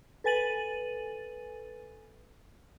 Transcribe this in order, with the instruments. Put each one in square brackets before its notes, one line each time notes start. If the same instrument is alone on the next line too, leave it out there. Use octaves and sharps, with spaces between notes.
[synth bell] A4 B4 G#5 A6 D#7 F#7